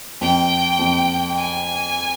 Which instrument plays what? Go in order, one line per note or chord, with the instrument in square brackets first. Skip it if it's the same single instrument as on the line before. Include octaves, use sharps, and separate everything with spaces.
[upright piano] F2 [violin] G5
[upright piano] F2
[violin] G#5